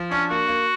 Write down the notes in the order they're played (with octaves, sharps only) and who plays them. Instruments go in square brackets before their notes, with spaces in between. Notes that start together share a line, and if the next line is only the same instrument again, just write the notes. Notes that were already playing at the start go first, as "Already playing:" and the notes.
Already playing: [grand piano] F3
[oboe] C#4 [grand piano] D4
[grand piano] A#3 [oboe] F#4
[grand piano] A#3